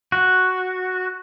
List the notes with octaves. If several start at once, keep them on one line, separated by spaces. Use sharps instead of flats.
F#4